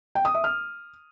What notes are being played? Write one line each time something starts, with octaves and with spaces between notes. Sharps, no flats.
G5
D#6
E5
F6